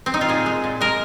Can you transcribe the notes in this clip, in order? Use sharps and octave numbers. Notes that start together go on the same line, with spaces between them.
C4
D#4
F4
A#2 G#4
G#3
A#2
G#3 A#4